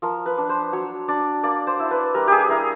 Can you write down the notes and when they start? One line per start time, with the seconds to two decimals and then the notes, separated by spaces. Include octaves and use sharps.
0.02 F3 A#4
0.26 B4
0.37 D4
0.49 C5
0.72 F#3 C#5
1.08 D4 D5
1.43 A#3 D5
1.67 C5
1.80 E4
1.91 B4
2.15 G3 A#4
2.28 G4 G#4
2.49 E4 A#4